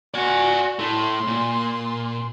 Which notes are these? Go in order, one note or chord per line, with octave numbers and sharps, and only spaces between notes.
F#4 D5 G#5
A3 E4 C6
A#2